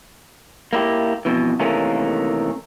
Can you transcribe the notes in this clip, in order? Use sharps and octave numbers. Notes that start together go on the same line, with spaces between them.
A#3 E4 G4
F2 B2 E3
C3 D#3 E3 A3 A#3 C#4